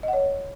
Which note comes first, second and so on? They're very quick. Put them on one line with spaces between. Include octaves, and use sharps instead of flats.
D#5 F#5 C#5